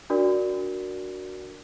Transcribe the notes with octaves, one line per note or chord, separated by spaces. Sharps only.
D4 F#4 A#4 D5